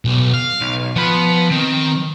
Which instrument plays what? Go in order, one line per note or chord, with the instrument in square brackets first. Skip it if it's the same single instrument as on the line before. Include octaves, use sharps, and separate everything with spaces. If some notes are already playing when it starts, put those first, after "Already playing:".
[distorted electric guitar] B1
F5
[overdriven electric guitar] B1
[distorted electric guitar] F3 [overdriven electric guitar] B3 B5
[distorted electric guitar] D#3 [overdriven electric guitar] C4